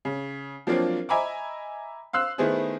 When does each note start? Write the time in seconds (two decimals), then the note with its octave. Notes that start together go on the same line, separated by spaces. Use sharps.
0.05 C#3
0.67 F3 F#3 A#3 C4 D4 F4
1.09 D#5 E5 G#5 A#5 B5 D6
2.13 F5 C6 E6 F#6
2.38 D#3 A3 B3 E4 G#4 C5